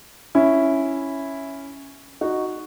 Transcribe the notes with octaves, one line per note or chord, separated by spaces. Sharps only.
C#4 E4
D#4 F#4